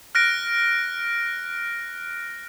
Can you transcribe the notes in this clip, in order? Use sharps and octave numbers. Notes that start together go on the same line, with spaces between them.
F6 F#6 A#6 D7